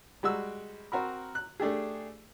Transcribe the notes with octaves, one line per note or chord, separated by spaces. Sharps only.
G3 G#3 F#4 E6
C4 F#4 A#4 B5
F#6
A3 D4 G4 G#4